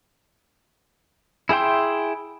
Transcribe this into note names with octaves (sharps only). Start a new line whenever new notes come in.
E4 G#4 E5 G5 C6